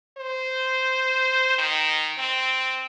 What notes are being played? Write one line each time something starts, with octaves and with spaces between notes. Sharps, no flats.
C5
D#3
C4